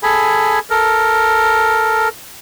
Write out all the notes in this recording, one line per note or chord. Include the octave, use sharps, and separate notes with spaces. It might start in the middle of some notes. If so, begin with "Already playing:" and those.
G#4 A4 G#5 B5
A4 A#4